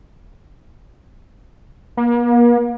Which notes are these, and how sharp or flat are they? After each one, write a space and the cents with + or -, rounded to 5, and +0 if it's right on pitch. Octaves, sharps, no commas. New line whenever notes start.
A#3 +40